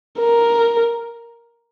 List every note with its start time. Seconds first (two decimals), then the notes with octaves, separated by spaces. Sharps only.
0.20 A#4